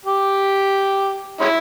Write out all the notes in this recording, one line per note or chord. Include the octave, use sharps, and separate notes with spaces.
G4
G#3 C#4 E4